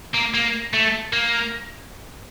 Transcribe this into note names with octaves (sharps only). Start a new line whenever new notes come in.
A#3
A#3
A3
A#3